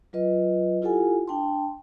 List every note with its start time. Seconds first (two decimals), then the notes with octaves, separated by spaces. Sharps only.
0.13 F#3 F4 B4 D#5
0.82 E4 F4 G4 A4 F#5 G#5
1.28 D4 G5 A5 C6